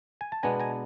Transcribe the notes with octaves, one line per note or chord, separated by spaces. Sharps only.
G#5
A5
B2 G#3 B3 D4 G#5 A#5
G#5 A#5